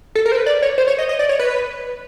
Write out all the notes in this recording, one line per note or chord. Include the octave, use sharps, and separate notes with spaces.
A4
A#4
C5
B4
D5
C#5
C5
C#5
D#5
D#5
D5
C#5
B4